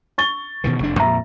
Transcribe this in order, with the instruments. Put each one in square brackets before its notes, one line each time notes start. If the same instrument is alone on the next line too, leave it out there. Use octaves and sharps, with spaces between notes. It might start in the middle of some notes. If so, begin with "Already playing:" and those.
[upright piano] C#6 A6 G7
[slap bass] B2 D#3 E3
F1 E2 D4
[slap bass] F2 A#2 [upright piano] E5 A#5